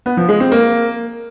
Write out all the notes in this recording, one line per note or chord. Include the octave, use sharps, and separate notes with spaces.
B3
F3
G#3
C4
A#3